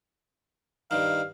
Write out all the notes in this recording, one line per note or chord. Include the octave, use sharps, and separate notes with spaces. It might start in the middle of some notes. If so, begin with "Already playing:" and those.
G2 D#3 F5